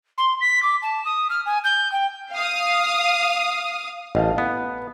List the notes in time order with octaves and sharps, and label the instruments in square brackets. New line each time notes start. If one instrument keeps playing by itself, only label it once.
[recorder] C6
B6
D6
A5
D#6
F6
G#5
G6
G5
[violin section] F5 D#6
[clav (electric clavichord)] A1 [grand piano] D#5 F5 A5
[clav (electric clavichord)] B3 [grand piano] B4